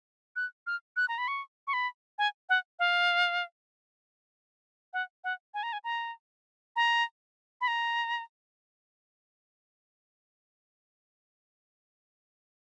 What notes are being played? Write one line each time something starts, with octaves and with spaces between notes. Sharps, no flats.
F#6
F6
F#6
A#5
B5
C#6
C#6
B5
G#5
F#5
F5
F#5
F#5
G#5
A#5
G#5
A#5
A#5
B5
A#5